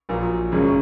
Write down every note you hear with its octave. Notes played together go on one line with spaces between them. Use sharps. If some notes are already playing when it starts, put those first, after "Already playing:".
A#1 A#2 F#3 A#3
G#1 F#2 C#3 G#3 C#4